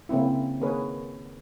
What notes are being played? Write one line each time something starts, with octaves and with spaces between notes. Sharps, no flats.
C#3 A#3 C4 E4
D#3 A#3 G#4 A#4 B4 C#5